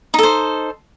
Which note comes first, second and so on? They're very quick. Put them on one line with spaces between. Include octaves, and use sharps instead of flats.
D#4 A4 C5